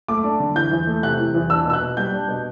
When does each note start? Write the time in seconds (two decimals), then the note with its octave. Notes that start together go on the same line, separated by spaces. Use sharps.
0.08 A3 D6
0.24 D4
0.40 D3
0.55 E3 G6
0.71 E2
0.87 A3
1.03 C3 F#6
1.19 E3
1.35 E2
1.49 D4 E6
1.65 B2 E6
1.73 F#6
1.81 B2
1.97 G3 G6
2.12 D4
2.28 B2